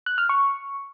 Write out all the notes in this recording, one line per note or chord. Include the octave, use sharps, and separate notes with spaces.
F#6
F6
C#6